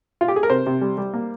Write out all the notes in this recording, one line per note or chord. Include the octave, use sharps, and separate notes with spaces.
F4
G4
G#4
A#4
C3 C5
C3
G3
G3
A#3